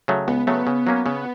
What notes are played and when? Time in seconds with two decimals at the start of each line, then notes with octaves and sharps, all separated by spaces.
0.08 C#3 F#3 A3
0.28 C#2 B3
0.47 C#3 F#3 A3 B3
0.67 C#3
0.87 F#3 A#3 C#4
1.06 C#3 B3